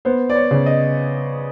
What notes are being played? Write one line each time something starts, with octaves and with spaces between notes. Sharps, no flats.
B3 C5
D5
C#5
C#3
D#5